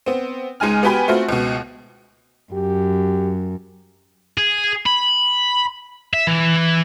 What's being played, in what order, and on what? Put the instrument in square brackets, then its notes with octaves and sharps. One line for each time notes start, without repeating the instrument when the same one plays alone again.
[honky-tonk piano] B3 C4
C#2 G#3 D#4 G#5 F6
B3 F#4 G4 B4 G#5 B5
A3 C4 F4 F#4
C#2 B2
[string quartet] F#2 [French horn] G4
[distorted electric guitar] G#4
B5
E5
E3